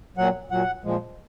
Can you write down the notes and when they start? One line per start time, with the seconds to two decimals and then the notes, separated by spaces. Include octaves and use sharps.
0.17 A#2 F#3 F#5
0.51 A#2 F#3 F#5
0.84 A#2 F3 G#3